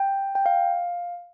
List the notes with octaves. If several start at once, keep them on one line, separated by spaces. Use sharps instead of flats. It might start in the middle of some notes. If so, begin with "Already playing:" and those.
Already playing: G5
G5
F5